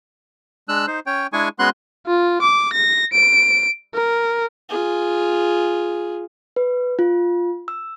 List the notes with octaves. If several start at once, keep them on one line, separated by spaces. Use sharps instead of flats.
G#3 D4 E6 F#6
D#4 C5
C#4 C#5 G5
G#3 D4 E4 G#4 G#5 C#6
G#3 B3 C#4 F#4 C6 F#6
F4
D6
A#6
D7
A#4
F4 G#4
B4
F4
E6